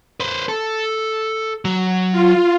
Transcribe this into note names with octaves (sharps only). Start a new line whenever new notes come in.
B4 C5
A4
F#3
F4